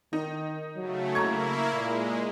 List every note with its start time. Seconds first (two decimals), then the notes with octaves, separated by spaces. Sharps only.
0.13 D#3 D#4
0.76 C#3 F#3 A3
1.15 A#3 E4 A#5 C#6 G#6
1.73 A#2 G#3